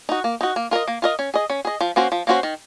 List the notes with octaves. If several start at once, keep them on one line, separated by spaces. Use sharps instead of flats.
D#4 F#4
A#3
D#4 F#4
A#3
F4 A#4 D#5
A#3
F4 A#4 D#5
C#4
G#4 D#5
C#4
G#4 D#5
F3
A#3 C#4 F#4 C5
F3
A#3 C#4 F#4 C5
D#3